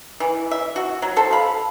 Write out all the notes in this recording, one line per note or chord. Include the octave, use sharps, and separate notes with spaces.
E3
E5
F#4
F#3
A4 C5
F5 B5